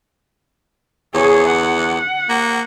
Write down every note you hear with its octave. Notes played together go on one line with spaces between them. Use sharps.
E2 G#4 C#5
F#5
A#3